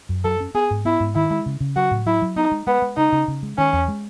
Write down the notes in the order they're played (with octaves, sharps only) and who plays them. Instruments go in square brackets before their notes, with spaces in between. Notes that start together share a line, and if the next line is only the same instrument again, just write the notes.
[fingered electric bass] F#2
[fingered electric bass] F#3 [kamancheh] A4
[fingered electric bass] C#4
[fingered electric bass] B3 [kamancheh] G#4
[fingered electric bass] G#2
[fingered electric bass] B3 [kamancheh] E4
[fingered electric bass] G#2
[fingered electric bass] D#3 [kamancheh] E4
[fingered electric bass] G#3
C#3
C#3
[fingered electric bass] F#3 [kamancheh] F#4
[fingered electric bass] A2
[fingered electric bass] F#3 [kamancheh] E4
[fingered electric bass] F#3
[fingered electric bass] B3 [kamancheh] D#4
[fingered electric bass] G#3
[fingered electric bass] G#3 [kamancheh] B3
[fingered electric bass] G#3
[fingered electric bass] C#3 [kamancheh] D#4
[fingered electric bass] C#3
C#3
G#3
[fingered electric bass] D#3 [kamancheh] C#4
[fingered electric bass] E2
G#3